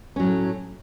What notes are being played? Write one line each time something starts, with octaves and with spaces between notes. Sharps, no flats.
A2 F#3 C#4